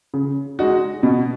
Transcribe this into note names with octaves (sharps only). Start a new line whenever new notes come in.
C#3
G#3 D#4 F#4
B2